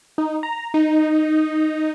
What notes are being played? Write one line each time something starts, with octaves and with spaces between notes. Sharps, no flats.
D#4
A#5
D#4